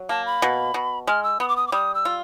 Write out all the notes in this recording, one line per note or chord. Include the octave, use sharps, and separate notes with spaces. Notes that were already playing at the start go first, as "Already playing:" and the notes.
Already playing: F#3
A#3 A5
B5
B2
B2
G#3 F6
E6
B3 D#6
D6
D#6
D6
G3 D#6
E6
F4